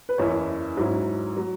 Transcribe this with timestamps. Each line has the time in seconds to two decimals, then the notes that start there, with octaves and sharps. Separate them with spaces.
0.09 B4
0.18 F#1 E2 E3 C#4 E4 C#5
0.77 G#2 F#3 C#4 E4
1.37 F#3